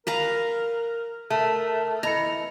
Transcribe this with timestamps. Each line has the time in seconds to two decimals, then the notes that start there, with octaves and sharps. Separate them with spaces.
0.07 A#4 B4 F5 A#5
1.30 A3 A#4 E5 A5
2.03 E3 D#5 A#5 B5 C#7